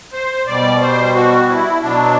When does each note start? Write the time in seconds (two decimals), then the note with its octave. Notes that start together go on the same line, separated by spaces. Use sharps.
0.13 C5
0.47 B2 G3 D5
0.81 C5
1.14 F#4
1.48 E4
1.82 B2 F#3 D4